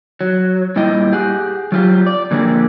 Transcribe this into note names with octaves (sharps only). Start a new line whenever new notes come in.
F#3
A#2 G3 E4 D#5 G5
G4 G#4 F#5
F#3 F4 G4
D5
A#2 D3 F3 A#3 G4 G#4